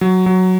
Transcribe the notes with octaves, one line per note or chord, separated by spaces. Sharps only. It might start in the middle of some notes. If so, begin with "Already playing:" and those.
F#3
F#3